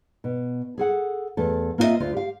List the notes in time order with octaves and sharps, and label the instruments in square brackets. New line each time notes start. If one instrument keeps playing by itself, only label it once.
[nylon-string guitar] B2
G#4 A4 F#5
E2 A3 A4
A#3 C4 F4 F#4 D#5 E5
D2 F4
G4 F5